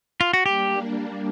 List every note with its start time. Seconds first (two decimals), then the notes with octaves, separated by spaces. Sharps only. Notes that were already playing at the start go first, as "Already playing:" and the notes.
0.21 F4
0.33 F#4
0.46 G3 A#3 D4 G4